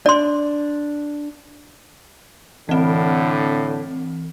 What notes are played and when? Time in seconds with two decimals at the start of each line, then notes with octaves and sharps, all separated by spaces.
0.06 D4 D5 C6
2.69 A2 D3 E3 C4